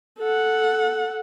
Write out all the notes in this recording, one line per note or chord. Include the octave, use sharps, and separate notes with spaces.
A4 F#5